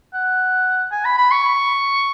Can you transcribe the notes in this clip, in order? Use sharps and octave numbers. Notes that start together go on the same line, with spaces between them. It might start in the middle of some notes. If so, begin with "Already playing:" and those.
F#5
G#5
B5
B5
C#6